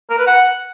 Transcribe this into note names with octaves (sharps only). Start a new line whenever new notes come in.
A#4
B4
F#5